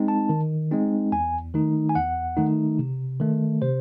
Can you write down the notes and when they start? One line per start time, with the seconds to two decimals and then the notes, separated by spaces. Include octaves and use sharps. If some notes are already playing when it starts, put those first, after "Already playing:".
Already playing: G#3 C4 D#4
0.08 A5
0.29 D#3
0.71 G#3 C4 D#4
1.12 E2 G#5
1.54 D#3 A3 D#4
1.89 G#5
1.95 E2 F#5
2.37 D#3 A3 D#4
2.79 C3
3.20 D#3 A3
3.62 C3 C5